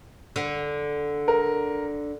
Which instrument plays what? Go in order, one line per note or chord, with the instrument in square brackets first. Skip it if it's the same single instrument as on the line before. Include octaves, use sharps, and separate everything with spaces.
[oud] D3
[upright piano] A#4